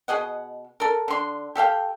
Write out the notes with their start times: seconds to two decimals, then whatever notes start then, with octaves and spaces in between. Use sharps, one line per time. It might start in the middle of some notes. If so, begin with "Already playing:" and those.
0.08 B2 G#4 D#5 F#5
0.80 A4 A#4
1.08 D3 C6
1.55 G4 A4 F5 G5